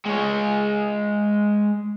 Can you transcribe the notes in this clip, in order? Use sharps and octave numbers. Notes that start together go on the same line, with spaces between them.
G#3 C#5